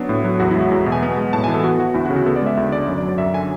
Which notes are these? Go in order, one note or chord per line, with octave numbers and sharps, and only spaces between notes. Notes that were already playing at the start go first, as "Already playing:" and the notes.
Already playing: F#3 B3 D4
A2
F#3
E2 F#4
E4
G#3 F#4
E2
B2
G#5
B3
G#3
A2 A5
G#5
E3
A4
B3 F#4
E3 F#4
D2 E4
F#4
C#3
F#4
B3 A4
D5
G#3 E5
D2 E5
D3 D5
F#2
D5
F#3
D5
F#2 E5
D3 G#5